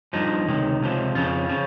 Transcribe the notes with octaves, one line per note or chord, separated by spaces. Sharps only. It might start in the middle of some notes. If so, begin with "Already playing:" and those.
G2 F3 D#4
C#2 C3 D#3
C#2 C3 F3
F2 C#3 F3 F4
C#3 F3